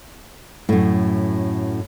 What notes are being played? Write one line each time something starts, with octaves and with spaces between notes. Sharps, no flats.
F#2 A2